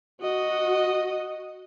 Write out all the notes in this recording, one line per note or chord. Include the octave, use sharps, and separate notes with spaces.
F#4 D#5